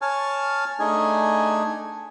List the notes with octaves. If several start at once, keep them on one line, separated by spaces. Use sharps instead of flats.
C#5 G#5 A5 F6
A3 D4 D#4 G#4 G#5